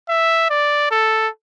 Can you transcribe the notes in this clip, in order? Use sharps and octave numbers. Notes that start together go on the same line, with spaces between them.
E5
D5
A4